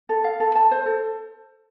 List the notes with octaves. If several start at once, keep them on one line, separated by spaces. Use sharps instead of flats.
A4
F5
A4
A5
C5
A4